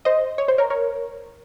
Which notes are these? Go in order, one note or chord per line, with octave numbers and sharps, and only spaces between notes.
C5 D#5
C#5
C5
A#4 C#5
A#4 C#5